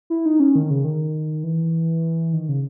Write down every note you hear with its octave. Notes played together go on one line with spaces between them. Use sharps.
E4
D#4
C#4
D#3
C#3
D#3
E3
D#3
C#3